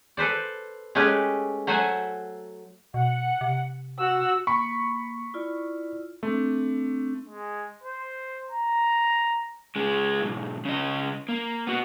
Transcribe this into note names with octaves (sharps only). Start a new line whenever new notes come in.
A4 B4 C5 D5
G#3 A3 C#4 G4 B4
F#3 A3 C5 E5 F#5 G#5
B2 F#5
C3
F#4 F#5 E6
A#3 B5 C#6
E4 F4 D5
A3 C4 D4
G#3
C5
A#5
C#3 G#3
B1 G#2
C#3 D#5
A#3
B3 F#4